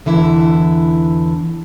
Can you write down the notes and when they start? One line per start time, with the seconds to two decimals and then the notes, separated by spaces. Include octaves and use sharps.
0.06 E2 D3 E3 E4